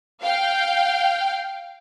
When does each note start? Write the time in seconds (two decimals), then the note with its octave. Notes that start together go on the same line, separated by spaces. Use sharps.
0.22 F5 G5